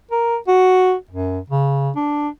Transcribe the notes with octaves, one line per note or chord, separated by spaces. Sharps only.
A#4
F#4
F#2
C#3
D4